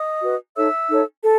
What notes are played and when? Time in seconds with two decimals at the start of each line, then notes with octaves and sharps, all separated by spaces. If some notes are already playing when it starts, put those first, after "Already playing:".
Already playing: D#5 D#6
0.23 F#4 B4
0.56 D#4 A4 C#5 E5 E6
0.90 D#4 A4 C#5
1.23 A4